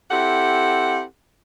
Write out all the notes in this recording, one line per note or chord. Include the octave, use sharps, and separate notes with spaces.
C4 E4 G4 A4 F#5